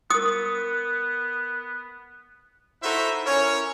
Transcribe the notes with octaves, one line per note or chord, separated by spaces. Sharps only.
B3 A#4 D#6 C#7
D#4 E4 F#4 A4 C5 E5
C#4 E4 A#4 C#5